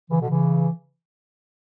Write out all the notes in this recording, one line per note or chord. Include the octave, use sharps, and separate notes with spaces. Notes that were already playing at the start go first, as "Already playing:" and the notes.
C#3 E3
B2 D3
C#3 E3